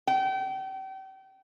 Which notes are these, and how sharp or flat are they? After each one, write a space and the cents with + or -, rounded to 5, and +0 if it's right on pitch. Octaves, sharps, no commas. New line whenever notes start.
G5 -35